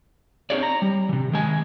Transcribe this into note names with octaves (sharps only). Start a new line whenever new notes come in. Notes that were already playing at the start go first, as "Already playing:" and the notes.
C4 D#4 G#4 C#5 D5
A#5
G3
C3 E3
D#3 G#3 G#5